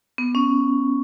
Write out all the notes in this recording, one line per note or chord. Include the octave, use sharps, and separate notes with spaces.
B3
C#4